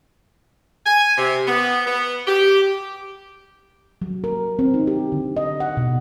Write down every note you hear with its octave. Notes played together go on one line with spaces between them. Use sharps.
G#5
C3
B3
B3
G4
F#3
A#4
C4
D#4
G4
D3
D#5
F#5
B2